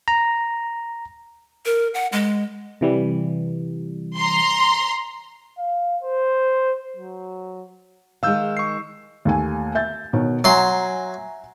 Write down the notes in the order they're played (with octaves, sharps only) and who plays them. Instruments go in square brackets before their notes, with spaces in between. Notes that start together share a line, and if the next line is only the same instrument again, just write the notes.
[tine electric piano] A#5
[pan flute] A#4
F#5
G#3
[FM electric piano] C3 E3 G3
[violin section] A#5 C6
[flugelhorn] F5
C5
F#3
[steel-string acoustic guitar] D#3 G#3 [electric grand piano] F5 E6 G6
[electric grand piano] C#6 C7
[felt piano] D#2 A3 G#5
E5 G6 A6
B2 D#3 C#5
[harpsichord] F#3 C6 [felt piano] E5 G#5 A#5